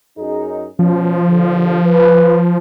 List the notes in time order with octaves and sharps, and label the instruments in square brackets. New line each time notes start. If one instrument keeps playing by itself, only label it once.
[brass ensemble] F#2 D#4 G#4
[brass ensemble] B2 C#4 [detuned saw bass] F3
[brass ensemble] D#2 D3
B4